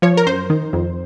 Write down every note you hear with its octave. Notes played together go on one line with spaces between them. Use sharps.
F3 C#5
A#4
F#2 C5
D#3
F2